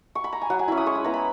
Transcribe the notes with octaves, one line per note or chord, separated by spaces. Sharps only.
C#6
B5
A#5
G#5
F#3 F#5
G#5
C#4 E4 B5
D#6
G#3 C#6
B5
B3 E4 A#5
B5